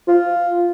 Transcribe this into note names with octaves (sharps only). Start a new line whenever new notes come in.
F4